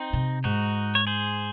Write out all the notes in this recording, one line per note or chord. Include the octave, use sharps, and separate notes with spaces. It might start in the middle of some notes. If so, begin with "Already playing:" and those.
Already playing: C4 D#4
C3
G#2 D#4 F#4
C#5
G#4 C5